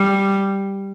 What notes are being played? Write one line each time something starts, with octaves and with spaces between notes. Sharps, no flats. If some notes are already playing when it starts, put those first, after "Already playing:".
Already playing: G3